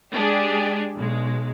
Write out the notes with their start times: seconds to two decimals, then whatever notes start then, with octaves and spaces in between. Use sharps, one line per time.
0.13 G#3 D4 G4 G#4
0.95 B1 G#3